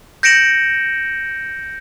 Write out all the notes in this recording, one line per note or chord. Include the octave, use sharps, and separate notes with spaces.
G6 A#6 C#7 D7 E7 F#7